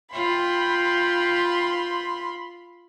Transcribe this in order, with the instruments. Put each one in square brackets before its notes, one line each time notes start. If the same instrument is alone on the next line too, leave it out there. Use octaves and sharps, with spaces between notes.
[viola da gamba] F4 [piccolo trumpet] G5 [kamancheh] B5 C6